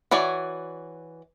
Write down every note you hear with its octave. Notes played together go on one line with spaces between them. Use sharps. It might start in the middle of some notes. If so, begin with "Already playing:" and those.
E3 F#4 C#5 D5